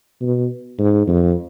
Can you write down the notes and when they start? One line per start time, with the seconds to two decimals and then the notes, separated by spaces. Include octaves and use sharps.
0.22 B2
0.79 G#2
1.07 F2